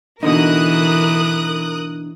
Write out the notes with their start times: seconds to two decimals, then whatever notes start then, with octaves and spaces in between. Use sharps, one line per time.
0.23 B2 D3 E3 D#4 A#4 D#6 F#6